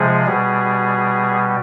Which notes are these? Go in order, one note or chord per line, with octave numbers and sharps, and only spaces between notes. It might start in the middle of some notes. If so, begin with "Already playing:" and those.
Already playing: C3 F3 G#3 G#4
B2 G3